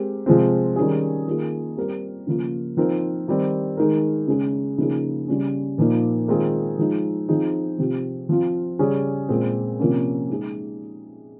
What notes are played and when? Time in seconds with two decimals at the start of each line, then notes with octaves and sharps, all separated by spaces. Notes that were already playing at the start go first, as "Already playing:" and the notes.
Already playing: G#3 C4 G4 A#4
0.26 C3 F3 G#3 C4
0.76 D#3 G3 C#4 G#4
1.27 D#3 A#3 F4 G#4
1.77 G3 C4 G4 A#4
2.27 C#3 F3 A#3 F4 A#4
2.77 F3 C4 D#4 A#4
3.28 D#3 G3 C4
3.77 D#3 G#3 D#4 A#4
4.27 C#3 G#3 C#4 G#4
4.78 C#3 F3 A#3 D#4 G#4
5.28 C#3 G3 C#4
5.78 A#2 F3 A#3 D#4
6.28 D#3 G#3 C4 F4 G#4
6.79 F3 G#3 D#4
7.29 F3 C4 D#4 G#4
7.78 C3 F3 C4 G4
8.29 F3 C4 F4
8.79 C#3 G3 C#4 G#4
9.29 A#2 G#3 C4
9.79 C3 F3 A#3 C#4
10.30 G#3 D#4 G#4